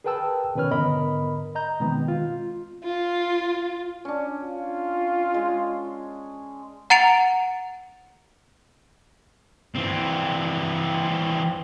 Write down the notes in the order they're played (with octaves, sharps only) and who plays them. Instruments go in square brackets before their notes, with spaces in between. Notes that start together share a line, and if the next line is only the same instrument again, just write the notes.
[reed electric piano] G#4 A#4 B4 G5 A5 E6
B2 D#3 C#4 B4 C#5 F6
G#2 D3 B3 A#4 D#5 B5
D#5 A#5 G6
B2 D#3 G#3 B3 C4
F4
[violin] F4
[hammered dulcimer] C#4 D4
[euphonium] F4
[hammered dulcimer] G#3
[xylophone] F#5 A#5 A6 C#7 D7 F7
[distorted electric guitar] E3 C4